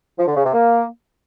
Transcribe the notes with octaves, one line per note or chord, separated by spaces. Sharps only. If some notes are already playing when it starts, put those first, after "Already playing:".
F3
D3
C#3
C3
A#3